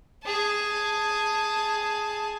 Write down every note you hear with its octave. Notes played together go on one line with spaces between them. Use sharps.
G#4 A5